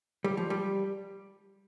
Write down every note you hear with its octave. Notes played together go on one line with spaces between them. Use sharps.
G3
F3
G3